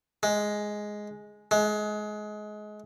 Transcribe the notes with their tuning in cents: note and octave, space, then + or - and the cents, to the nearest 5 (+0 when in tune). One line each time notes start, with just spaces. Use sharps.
G#3 +5
G#3 +25